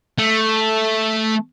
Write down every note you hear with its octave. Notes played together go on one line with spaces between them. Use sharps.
A3